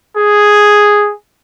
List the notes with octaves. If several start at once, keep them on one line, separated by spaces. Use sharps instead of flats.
G#4